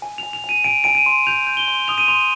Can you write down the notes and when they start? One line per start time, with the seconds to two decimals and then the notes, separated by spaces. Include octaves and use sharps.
0.02 G#5
0.18 G#5 F7
0.33 F7
0.44 G#5 D#7
0.64 G#5 D7
0.84 G#5 D7
0.95 D#7
1.06 C6
1.27 G6 F7
1.47 G6
1.57 G7
1.68 C6
1.88 D#6 F7
1.98 D#7
2.08 C6 F7